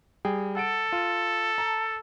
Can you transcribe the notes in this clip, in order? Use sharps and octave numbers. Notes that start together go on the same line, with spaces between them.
G3 G#4 G5
A4 F#5 D7
F4
A5 A#5